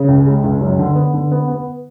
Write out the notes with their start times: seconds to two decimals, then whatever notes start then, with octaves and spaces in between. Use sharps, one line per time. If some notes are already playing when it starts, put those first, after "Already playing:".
Already playing: C#3
0.08 C#2
0.26 G#3
0.44 C#2
0.61 F#2
0.79 D3
0.95 B3
1.13 D3
1.32 B3
1.48 B3